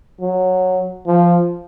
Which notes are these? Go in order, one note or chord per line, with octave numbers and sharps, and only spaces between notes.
F#3
F3